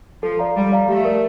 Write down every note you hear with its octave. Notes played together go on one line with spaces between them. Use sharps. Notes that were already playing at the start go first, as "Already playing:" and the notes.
F3 A4
D5 F5 A#5
G3 A4
D5 F5 A#5
A3 G4
A#4 D5